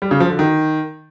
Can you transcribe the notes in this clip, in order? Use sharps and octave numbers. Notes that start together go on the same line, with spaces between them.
G3
C#3
F3
D3
D#3